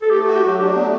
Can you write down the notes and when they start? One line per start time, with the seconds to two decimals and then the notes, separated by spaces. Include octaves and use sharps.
0.02 A4
0.10 A3 G4
0.27 F#4
0.35 G4
0.43 F#3
0.59 D4 G4
0.75 A3 B3